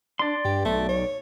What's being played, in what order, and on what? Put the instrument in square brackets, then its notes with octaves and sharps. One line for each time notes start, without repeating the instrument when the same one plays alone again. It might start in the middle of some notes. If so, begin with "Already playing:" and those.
[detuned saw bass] D4 [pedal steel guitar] D5 C6
[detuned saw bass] G2 [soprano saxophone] G4
[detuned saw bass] B1 [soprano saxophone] A3
[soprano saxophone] C#5